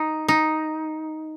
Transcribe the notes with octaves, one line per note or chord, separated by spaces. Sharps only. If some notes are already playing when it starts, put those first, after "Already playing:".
Already playing: D#4
D#4